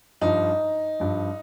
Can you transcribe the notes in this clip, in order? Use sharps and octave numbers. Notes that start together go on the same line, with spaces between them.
G2 F3 D#4
G2 F3